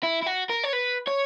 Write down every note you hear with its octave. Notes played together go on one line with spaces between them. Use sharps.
E4
E4
F#4
A#4
C#5
B4
C#5